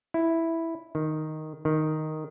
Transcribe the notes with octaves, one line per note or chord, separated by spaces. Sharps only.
E4
D#3
D#3